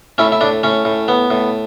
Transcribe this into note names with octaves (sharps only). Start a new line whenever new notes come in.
A2 C#4 E4
E4
A2 D4
A2 C#4
A2
B3
A2